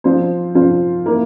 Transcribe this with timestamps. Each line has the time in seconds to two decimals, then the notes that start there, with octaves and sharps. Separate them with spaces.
0.04 F3 C4 F4 C5
0.55 F3 C4 F4 C5
1.06 A#3 E4 A#4